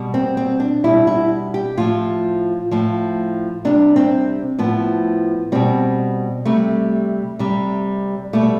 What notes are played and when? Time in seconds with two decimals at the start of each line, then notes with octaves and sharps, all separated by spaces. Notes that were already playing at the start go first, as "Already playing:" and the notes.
Already playing: B2 G3
0.14 C4
0.37 C4
0.60 D4
0.84 B2 G3 E4
1.07 E4
1.54 G4
1.77 A2 F3 F4
2.71 A2 F3
3.65 C3 G3 D4
3.96 C4
4.59 A2 F3 B3
5.52 B2 G3 C4
6.45 C3 G3 A3
7.39 C3 G3
8.33 B2 G3 A3